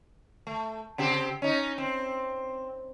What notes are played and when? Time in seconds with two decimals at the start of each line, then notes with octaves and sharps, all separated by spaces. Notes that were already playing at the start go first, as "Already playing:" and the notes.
0.47 A3
0.98 C#3 C4 G4
1.42 C#4 D#4
1.78 C4